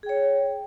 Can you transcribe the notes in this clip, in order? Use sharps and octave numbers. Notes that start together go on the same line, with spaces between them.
G#4 C#5 G5